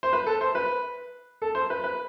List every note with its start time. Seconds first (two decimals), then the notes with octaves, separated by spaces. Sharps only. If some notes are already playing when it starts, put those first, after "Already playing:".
0.03 C5
0.13 B4
0.26 A4
0.41 C5
0.55 B4
1.42 A4
1.55 C5
1.70 B4
1.84 B4